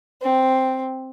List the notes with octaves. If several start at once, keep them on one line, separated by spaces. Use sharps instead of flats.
C4